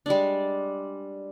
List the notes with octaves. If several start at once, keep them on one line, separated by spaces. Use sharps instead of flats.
G3 G#3 D4